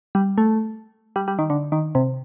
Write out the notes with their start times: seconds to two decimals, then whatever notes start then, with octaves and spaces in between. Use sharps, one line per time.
0.15 G3
0.38 A3
1.16 G3
1.28 G3
1.39 D#3
1.50 D3
1.72 D#3
1.95 C3